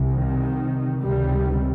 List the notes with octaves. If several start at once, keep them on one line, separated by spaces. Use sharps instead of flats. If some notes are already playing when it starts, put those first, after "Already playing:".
Already playing: C2 C3
D#3
C#2 C3 D#3 G3